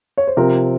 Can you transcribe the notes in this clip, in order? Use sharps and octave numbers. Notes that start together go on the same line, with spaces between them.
C#5
C5
C3 F3 C4 A#4